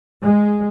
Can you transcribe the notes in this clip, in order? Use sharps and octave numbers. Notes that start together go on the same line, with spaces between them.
G#3